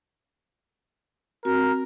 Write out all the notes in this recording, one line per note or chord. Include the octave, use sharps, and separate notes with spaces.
C4 F#4 A#4